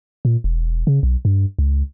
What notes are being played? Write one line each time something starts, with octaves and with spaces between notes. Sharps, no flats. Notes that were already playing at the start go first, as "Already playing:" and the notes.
A#2
E1
C#3
B1
G2
C#2